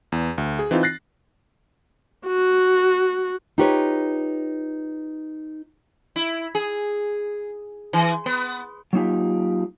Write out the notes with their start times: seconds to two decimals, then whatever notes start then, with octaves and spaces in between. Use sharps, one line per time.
0.12 E2
0.38 D2
0.59 G#4
0.71 E3 C4 D#4 F4
0.83 F#6 A6 A#6 C7
2.26 F#4
3.58 D#4 F4 G4 B4 C#5
6.16 E4
6.55 G#4
7.93 E3
8.26 B3
8.93 F#3 A#3 D#4 F4 G4